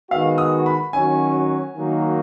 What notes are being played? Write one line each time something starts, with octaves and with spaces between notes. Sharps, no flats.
D#3 G#3 B3 F#4 F5
D#6
B5
D#3 F#3 C#4 F#4 G#5
D#3 F#3 A#3 D#4 F#4